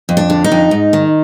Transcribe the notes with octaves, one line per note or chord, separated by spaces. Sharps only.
F2
D4
D3
D#4
F2
G#2
D#3